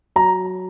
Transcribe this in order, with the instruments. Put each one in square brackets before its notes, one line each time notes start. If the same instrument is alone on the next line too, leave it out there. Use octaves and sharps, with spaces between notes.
[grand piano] F#3 A#5